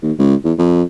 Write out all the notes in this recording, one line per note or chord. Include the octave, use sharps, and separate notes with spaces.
D#2
C#2
E2
F2